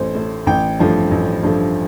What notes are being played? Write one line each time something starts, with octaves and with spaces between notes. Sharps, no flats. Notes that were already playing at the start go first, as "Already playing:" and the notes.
Already playing: A1 A2 A3 C5
A2 A3
A1 G5
G2 F3 A3
A1
G2 F3 A3